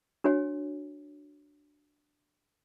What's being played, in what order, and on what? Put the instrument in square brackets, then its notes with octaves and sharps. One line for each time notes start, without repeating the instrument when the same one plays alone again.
[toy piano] D4 F#4 C#5 G#5